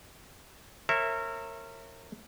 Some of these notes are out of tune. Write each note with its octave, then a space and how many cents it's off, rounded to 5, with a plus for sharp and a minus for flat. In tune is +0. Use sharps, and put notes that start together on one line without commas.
A#4 -25 C#5 -30 E5 +0